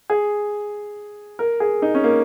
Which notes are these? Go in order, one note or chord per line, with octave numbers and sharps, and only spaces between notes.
G#4
A#4
G#4
D#4
C#4
A#3